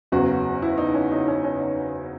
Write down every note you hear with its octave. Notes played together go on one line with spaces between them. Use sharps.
F#1 E2 C#3 F#3 F#4
E4
D#4
C#4
D#4
C#4
C#4
D#4